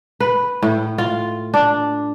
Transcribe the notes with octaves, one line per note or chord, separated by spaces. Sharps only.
B4
A2
F4
D4